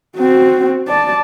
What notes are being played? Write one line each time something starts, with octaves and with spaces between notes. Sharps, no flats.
C4 F#4
D5 A5